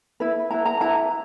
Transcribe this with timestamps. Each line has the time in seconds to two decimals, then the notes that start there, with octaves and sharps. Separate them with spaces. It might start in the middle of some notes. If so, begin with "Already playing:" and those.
0.20 E4 B4
0.50 E4 B4 A#5
0.65 A#5
0.81 E4 B4 A#5